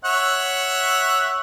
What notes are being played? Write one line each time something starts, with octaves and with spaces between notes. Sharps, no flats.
C#5 E5 F#5